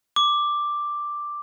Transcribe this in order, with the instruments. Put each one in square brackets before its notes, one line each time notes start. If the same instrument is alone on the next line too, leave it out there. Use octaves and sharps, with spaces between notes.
[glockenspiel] D6